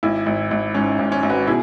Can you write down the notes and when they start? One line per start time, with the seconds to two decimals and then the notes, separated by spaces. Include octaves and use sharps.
0.03 G#1 E4
0.26 G#1
0.51 G#1
0.75 G#2 C#4
0.99 G#1
1.12 C#4
1.23 G#1
1.29 F#4 B4
1.47 B2 E4 G#4